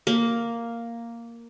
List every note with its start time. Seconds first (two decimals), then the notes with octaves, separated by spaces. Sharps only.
0.07 A#3